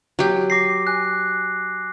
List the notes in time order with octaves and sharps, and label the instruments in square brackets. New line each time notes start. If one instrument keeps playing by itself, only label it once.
[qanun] F#3 G4
[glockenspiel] D6 A#6 C7
G#5 F#6